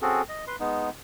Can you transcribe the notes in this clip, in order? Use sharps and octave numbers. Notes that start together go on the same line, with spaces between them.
C4 C#4 F#4 G#4 A4
D#5
B4 C6
G#3 B3 D#4